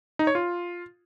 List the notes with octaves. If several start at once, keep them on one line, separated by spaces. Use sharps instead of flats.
D#4
C#5
F4